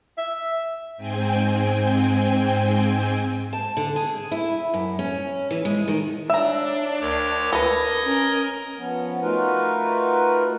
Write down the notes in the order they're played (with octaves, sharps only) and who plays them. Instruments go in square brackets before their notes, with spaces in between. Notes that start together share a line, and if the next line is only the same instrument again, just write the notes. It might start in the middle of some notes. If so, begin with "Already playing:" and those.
[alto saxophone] E5
[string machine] G#2 C4 G5 G#5
[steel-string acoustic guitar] A5
D3
G#4
E4
F#2
C#4
E3
G#3
D#3
[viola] D4 [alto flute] C#5 [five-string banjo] E5 A#5
[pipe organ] D2 C#5 D6 [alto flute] A#4
[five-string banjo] A4 B4 [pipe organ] D#5 D#6 G#6
[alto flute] C#4 [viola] A#4
[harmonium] F3 B3 C#4
A3 D#4 F4 F#4 A#4 B4